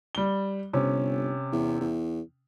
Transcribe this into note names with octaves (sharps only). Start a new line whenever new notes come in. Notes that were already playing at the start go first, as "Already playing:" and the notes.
G3 G7
G1 C3 C#4
E2
E2